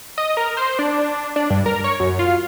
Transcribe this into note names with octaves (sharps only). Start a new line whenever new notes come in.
D#5
A#4
C5
D4
D4
G2
A#4
C#5
F#2
F4